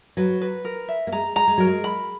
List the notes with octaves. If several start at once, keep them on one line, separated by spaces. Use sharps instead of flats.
F#3 B4
B4
A#4
E5
A#3
G#3 A#5
G#3 A#5
G#3
F#3 A#4
G#3
B5